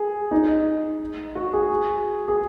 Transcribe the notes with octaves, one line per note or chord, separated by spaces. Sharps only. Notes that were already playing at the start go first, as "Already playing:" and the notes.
Already playing: G#4
D#4
F#4
G#4
G#4